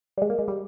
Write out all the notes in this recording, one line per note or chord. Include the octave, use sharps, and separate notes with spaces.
G3
G#3
A#3
G#3
G3